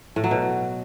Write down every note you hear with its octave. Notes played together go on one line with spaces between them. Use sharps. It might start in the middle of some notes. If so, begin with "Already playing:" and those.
A2
F#3
B2